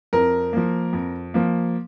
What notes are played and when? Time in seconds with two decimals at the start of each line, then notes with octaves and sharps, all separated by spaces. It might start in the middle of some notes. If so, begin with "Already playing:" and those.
0.13 F2 A#4
0.53 F3 A#3
0.93 F2
1.34 F3 A#3